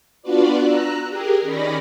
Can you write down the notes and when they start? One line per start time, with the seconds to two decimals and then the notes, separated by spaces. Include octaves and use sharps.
0.22 B3 D4 F4 F#4 B4 D5
0.62 A#5 E6 F#6
1.08 G4 G#4 A#4
1.42 D#3 C#4 D5 B5 A#6